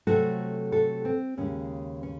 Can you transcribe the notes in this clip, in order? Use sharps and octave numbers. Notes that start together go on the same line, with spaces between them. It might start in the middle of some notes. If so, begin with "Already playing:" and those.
C3 F#3 A3 F#4 A4
F#4 A4
C4
D#2 C#3 G#3 C#4
C#4